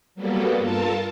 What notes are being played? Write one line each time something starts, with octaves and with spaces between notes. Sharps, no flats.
F#3 G3 A#3 B3 A4
G2 F4 A4 A#4 A5